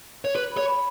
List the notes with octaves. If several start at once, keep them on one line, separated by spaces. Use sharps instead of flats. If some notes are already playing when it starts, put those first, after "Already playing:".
C#5
B4
B5
C#5
B5